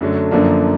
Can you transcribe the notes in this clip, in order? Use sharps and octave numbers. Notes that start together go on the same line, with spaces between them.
F#2 D3 F#3 A3
F#2 D3 F3 A#3 D4